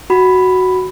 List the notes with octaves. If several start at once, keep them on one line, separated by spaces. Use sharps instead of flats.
F#4 B5